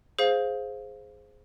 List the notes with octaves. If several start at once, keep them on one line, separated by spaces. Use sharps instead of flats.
G#4 C5 F5